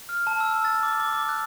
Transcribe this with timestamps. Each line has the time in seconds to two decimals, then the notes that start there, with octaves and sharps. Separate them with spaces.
0.09 F6
0.27 A5
0.41 E6
0.53 E6
0.65 A6
0.83 D6
1.00 D6
1.13 D6
1.29 F#6